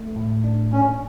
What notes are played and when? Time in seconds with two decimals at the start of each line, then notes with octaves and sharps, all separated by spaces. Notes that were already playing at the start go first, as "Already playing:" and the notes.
Already playing: A3
0.16 A2
0.44 D4
0.72 A#2 C#4